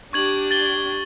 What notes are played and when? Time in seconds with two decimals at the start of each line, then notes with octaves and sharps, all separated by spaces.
0.13 D4 G4 C#6 G#6 F#7
0.51 A6 G7